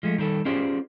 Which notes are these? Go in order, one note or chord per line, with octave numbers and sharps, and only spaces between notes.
F3 G#3 A3
D#3 G3 A4
C#4 F4 G4 G#4 C5 D5